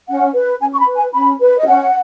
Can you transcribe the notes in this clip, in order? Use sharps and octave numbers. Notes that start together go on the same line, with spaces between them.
C#4 F#5
B4
C#4 G#5
C#6
B5
B4
G#5
C#4 B5
B4
D#5
C#4 F#5